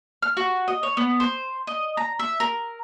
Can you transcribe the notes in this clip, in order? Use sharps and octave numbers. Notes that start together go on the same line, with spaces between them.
F6
F#4
D#5
C#5
B3
C5
D#5
A#5
E5
A#4